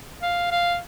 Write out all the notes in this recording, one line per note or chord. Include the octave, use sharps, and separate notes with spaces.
F5
F5